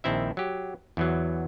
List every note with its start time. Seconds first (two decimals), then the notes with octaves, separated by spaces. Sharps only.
0.04 A#1 D#3 C4 E4 E5
0.37 F#3 G4
0.97 E2 E3 F#3